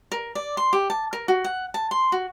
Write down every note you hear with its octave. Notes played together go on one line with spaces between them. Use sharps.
A#4
D5
C6
G4
A5
A#4
F#4
F#5
A5
C6
F#4